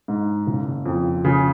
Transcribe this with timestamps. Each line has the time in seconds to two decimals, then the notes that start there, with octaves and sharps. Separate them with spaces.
0.08 G#2
0.47 F#1
0.86 F2
1.25 C#3